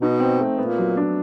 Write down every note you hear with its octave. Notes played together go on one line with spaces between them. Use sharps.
B2 D#4
C4
A3
A#2 B3
F#3
D4